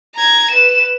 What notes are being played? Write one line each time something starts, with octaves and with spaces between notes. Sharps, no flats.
A#5 G#6
B4 E7